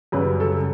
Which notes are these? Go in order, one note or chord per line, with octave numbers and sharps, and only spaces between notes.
F#2 C#3 G3 B4
A4